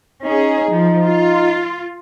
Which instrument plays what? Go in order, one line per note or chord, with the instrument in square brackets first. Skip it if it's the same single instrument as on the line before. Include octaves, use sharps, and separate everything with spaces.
[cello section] C#4 G#4 [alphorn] D#4
[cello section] F3
F4